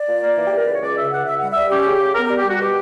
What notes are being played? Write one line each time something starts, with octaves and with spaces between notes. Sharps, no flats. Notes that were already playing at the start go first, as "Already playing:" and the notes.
Already playing: D5
A#2
A#3
E3
G4
E3 A#4
C#2 B4
C#5
C#2 D5
C#3 E5
C#2 F#5
C#3 E5
G3 F#5
G3 E5
C#4 G4
C#3
C#3
B3 A#4
G3 A#4
G4
G3 F#4
B2 G4